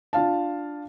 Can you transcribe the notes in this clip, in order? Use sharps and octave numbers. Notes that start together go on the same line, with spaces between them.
D4 F4 F5 A5